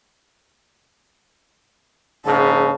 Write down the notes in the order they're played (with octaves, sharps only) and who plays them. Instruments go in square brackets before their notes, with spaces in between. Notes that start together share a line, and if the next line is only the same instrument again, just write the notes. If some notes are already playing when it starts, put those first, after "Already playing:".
[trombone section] A#1 G#2 C#3 [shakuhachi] A5